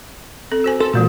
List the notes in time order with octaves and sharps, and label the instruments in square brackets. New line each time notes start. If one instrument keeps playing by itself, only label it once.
[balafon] C4 A4
F#4 C5 G#5
[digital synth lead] A4 [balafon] C6
[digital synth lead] A#2 [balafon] E3 G#3 F#4